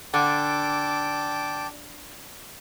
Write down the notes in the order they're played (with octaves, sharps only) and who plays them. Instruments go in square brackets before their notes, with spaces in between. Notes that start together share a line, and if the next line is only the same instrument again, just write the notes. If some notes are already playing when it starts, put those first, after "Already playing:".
[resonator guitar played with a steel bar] D3 [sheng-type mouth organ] G5 A5 D6